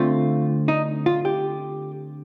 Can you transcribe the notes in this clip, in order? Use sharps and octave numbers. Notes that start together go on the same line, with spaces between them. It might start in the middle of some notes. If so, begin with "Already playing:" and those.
Already playing: D3 A3 C4 F4
D#4
F4
G4